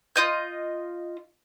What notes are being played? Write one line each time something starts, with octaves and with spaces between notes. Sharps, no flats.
F4 D#5 G6